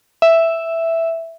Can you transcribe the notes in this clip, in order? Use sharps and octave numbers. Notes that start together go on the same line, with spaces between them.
E5